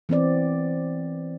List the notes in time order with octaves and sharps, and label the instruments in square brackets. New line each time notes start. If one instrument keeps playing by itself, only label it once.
[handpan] E3 B3 C4 D5